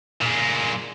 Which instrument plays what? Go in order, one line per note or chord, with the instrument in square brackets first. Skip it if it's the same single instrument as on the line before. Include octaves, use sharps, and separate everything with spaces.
[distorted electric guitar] A#2 G#3